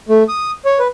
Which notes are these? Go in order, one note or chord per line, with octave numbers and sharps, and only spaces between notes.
A3
D#6
C#5
B4